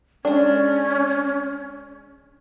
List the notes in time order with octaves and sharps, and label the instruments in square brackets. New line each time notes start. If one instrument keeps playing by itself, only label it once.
[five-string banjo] G#3 D4 [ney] C#4